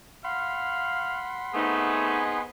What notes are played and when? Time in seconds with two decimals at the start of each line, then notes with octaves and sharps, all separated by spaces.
0.24 F5 F#5 B5 C6
1.54 A3 B3 C4 D#4 G#4